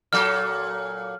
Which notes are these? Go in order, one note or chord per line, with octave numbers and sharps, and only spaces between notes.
A#2 F#3 A4 F6